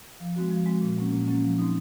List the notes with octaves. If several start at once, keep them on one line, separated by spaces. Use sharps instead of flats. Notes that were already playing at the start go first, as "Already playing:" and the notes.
F3
G#3 C4 F#4
F3
G#3 C4 F#4
A#2
F#3 A#3 C#4
A#2
F#3 A#3 C#4
F3
C4 D#4